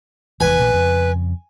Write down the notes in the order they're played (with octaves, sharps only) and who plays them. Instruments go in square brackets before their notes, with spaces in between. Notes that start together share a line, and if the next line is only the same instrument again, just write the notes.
[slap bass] F1 E2 E3 [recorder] B4 [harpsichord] G#5
[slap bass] A#1 A#2 E3
F2 C#3